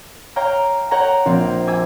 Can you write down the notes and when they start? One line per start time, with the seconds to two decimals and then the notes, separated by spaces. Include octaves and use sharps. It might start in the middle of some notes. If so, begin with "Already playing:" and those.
0.36 C#5 F5 G5 A#5 F6
0.91 C#5 F#5 G5 A#5
1.26 A#1 C4 F5
1.67 G#5 D6 E6 G#6